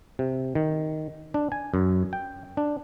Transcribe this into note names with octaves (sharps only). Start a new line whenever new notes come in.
C3
D#3
D4
G#5
F#2
G5
D4